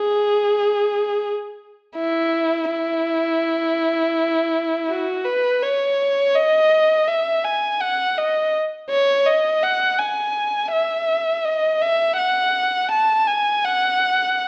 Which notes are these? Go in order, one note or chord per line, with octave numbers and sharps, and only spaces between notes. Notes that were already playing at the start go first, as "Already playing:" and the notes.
Already playing: G#4
E4
E4
F#4
B4
C#5
D#5
E5
G#5
F#5
D#5
C#5
D#5
F#5
G#5
E5
D#5
E5
F#5
A5
G#5
F#5